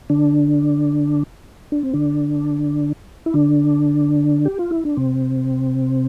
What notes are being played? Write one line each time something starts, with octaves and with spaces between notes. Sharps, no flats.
D3 D4
D4
C4
D3 D4
E4
D3 D4
G4
F4
E4
D4
C3 C4